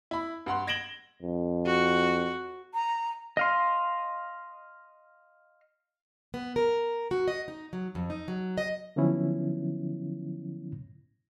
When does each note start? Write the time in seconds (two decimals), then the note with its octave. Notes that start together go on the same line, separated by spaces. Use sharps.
0.11 E4 B5
0.46 G2 F#5 C6
0.67 G#6 A#6 D7 E7 F#7 G7
1.22 F2
1.66 F#4
2.74 A#5
3.37 D#5 F5 C6
6.34 B3
6.56 A#4
7.11 F#4
7.28 D#5
7.48 D#4
7.73 F#3
7.95 F2
8.10 D#4
8.28 F#3
8.58 D#5
8.96 D3 F3 F#3 B3 C#4 E4